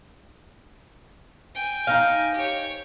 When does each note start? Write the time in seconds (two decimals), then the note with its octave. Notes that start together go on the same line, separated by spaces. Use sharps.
1.55 G5 G#5
1.87 D#4 F5
2.34 G4 C#5